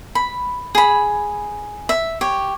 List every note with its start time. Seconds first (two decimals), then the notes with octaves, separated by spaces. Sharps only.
0.15 B5
0.75 G#4 B5
1.89 E5
2.21 G4 C#5